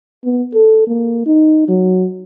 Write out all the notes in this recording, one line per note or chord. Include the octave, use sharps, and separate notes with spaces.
B3
A4
A#3
D#4
F#3